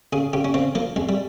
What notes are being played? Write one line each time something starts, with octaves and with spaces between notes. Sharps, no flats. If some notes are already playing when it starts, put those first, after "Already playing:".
C#3 G#4
C#3 G4
C#4
C#3 C4
F3 A#3
F2 G#3
G3